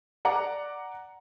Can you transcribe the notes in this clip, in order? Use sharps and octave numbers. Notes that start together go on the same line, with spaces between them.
D5 F#5 A#5 D6